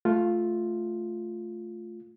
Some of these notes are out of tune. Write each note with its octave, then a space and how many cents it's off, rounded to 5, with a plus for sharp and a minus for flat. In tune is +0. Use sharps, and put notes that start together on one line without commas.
A3 -10 F4 +0